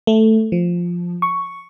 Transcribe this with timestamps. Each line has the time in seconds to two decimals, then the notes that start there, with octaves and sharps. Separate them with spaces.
0.07 A3
0.52 F3
1.22 C#6